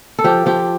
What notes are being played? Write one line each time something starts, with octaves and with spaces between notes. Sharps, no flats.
A4
F3 G4
F3 G4